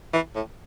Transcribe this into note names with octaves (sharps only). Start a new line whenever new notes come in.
E3
A2